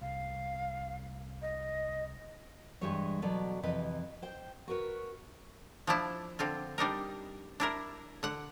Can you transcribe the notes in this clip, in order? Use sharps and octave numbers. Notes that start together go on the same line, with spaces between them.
C2 F5
D#5
G2 E3 G3 G#3 C#5
B2 F#3 A4 B4 D5
F2 C3 E3 B4 D#5
C5 G5
F#4 A#4 B4 C#5
F3 D4 E4
D3 C4 F4
G3 D4 D#4 A#4
D4 E4 A#4
D3 F#5